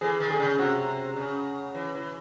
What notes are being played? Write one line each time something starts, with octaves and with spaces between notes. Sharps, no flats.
E3 G#4
D#3
G#4
C#3
C3 F#4
C#3
E3
E3